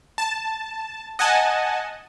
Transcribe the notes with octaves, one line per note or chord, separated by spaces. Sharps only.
A5
D#5 F#5 G#5 A5